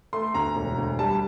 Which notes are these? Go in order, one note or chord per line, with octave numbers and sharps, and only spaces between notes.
A3 C6
D2 A#5
E1
D2
G3 A5